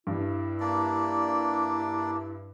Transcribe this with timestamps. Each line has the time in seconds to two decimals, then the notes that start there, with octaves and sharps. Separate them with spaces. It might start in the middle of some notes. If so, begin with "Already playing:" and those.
0.07 G2 E4
0.60 A#3 D4 D5